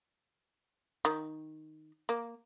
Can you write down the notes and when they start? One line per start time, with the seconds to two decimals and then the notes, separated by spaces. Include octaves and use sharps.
1.05 D#3
2.09 A#3